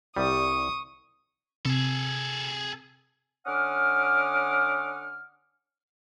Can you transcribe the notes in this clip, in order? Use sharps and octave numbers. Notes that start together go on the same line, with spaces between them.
C2 G3 C#6 D#6
C3 G#4 A4
D3 C#4 F#5 D6 D#6 F6